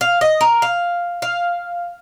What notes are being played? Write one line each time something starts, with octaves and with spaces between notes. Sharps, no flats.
F5
D#5
A#4
F5
F5